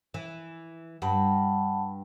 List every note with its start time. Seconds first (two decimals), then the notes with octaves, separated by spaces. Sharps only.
0.14 E3
1.02 G2 F#5 A5 B5